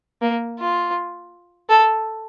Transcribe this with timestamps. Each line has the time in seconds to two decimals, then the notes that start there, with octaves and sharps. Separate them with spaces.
0.22 A#3
0.59 F4
1.69 A4